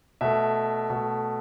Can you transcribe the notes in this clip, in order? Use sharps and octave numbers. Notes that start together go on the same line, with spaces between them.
B2 A3 E5
B2 A3